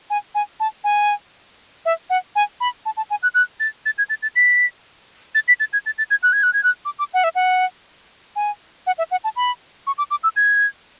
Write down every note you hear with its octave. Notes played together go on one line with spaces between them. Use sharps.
G#5
G#5
A5
G#5
E5
F#5
G#5
B5
A5
A5
G#5
F#6
F#6
A6
A6
G#6
A6
A6
B6
A6
B6
A6
G#6
A6
A6
G#6
F#6
G#6
F#6
G#6
F#6
D6
D6
F#5
E5
F#5
G#5
F#5
E5
F#5
A5
B5
C#6
D6
D6
E6
G#6